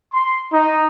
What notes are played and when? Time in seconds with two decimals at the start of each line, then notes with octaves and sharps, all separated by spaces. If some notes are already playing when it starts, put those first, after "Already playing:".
0.13 C6
0.52 D#4